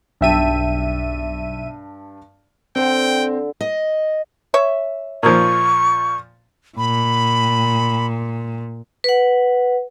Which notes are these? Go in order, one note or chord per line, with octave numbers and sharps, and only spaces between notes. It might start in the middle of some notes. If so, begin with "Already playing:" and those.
B1 G2 E5 G5 A5 D#7
D3 C4 C5 G5
D#5
C#5 E5
A#2 F3 C#6
A#2 B5
B4 F#5